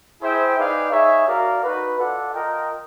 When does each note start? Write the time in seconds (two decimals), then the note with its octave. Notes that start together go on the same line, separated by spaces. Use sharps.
0.21 E4 G#4 C5 E5 G5
0.57 D#4 G#4 B4 D5 F5
0.92 D#4 G#4 C#5 E5
1.27 F#4 A#4 D5 F5
1.63 D#4 F#4 B4
1.98 F4 A4 D5 F#5
2.34 F4 A#4 D#5 G5